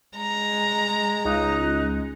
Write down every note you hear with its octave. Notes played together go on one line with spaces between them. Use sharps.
G#3 A#5
C#2 D#4 F#6